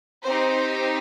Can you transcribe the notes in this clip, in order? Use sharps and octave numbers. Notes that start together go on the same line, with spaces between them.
C4 D#4 G4 C5